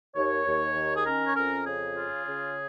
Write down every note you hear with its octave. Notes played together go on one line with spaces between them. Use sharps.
D#2 C#5
D#2
D#3
G#4
C#4 A#4
C#5
F2 A#4
C#3 G#4
F4
C#3